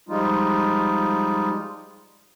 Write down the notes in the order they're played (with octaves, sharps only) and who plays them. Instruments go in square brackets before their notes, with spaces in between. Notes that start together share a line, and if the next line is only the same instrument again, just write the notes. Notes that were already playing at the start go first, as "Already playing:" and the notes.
[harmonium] F3 G3 G#3 D#4 F4